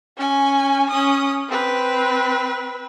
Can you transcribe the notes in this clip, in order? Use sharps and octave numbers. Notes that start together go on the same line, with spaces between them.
C#4 G#5
C#4 D#6
C4 B4